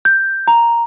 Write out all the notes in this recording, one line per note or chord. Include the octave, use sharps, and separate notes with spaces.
G6
A#5